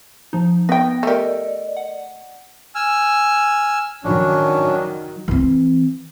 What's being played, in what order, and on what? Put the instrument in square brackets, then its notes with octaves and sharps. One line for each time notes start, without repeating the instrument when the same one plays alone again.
[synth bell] F3 D#4
[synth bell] B3 A#6 [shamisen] B4 G5
[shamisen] A3 G4 [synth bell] A4 A#4 [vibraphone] D5 D#5
[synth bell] F#5
[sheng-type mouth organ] G#5 E6 F6
[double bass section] D#3 F#3 [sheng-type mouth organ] C#4 D4
[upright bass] E3 C4